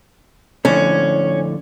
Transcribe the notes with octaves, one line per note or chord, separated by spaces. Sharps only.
F2 A2 D3 C#4